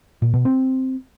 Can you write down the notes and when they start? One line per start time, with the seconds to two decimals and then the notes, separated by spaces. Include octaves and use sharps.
0.22 A#2
0.34 B2
0.45 C4